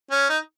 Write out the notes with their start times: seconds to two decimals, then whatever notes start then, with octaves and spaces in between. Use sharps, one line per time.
0.11 C#4
0.30 D#4